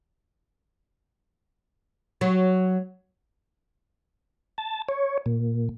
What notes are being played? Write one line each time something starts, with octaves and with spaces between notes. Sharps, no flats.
F#3
A5
C#5
A#2